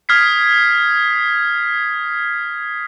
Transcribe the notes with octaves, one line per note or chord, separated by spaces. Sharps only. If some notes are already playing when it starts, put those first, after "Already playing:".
D#6 F6 G#6 B6 C7